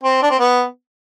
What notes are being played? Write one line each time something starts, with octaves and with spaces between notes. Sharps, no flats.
C4
D4
C4
B3